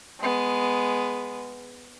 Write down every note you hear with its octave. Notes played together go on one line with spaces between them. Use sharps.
G#3 B3